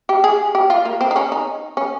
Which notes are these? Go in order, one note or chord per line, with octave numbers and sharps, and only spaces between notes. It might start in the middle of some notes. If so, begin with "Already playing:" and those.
G4
G#4
G4
F4
A#3
C4
D#4
C#4
D#4
C#4